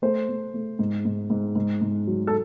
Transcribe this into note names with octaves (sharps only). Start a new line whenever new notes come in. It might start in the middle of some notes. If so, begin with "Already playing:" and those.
A3 C5
A3
A3
G#2
G#2
G#2
G#2
G#2
F#3
A4